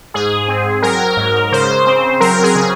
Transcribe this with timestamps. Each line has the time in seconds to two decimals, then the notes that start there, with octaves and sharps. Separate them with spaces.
0.14 G#2 G#4
0.48 C4
0.82 F#3 A#4
1.17 G#2
1.52 C#3 C5
1.87 C4
2.20 F#3 A#4
2.44 G#4
2.56 C#3